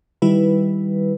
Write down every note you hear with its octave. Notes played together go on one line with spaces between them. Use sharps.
D#3 G3 E4 B4